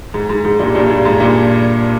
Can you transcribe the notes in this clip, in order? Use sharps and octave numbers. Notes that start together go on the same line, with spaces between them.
G#2
G#2
G#2
G2 A#2
G2 A#2
G2
G#2
G2 A#2